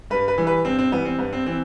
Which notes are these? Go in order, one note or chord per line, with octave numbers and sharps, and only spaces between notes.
G2 B4
B4
E3 G3
B4
G2 C4
C4
E3 G3 B3
C4
G2 B3
C4
E3 C4